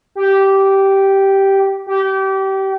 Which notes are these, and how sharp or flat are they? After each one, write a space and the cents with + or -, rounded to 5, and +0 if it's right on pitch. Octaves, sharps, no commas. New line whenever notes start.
G4 -10
G4 -25